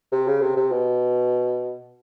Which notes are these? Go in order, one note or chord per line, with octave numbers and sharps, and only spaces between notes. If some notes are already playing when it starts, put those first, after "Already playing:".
C3
C#3
C3
C3
B2